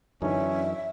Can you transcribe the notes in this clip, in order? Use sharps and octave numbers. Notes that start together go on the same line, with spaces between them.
F#2 D3 E3 C#4 D#4 E5